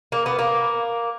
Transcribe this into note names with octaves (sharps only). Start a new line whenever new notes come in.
A#3
B3
A#3